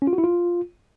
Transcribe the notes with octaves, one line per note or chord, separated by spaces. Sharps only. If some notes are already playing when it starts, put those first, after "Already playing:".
C#4
F4
F#4
E4
F4